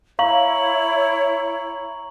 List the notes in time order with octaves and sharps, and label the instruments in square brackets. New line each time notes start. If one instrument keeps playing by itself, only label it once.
[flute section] E4 C#5 [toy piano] F5 [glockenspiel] A#5 C#6 F#7